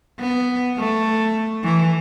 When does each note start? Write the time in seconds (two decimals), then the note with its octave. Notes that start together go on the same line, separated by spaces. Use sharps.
0.19 B3
0.78 A3
1.64 E3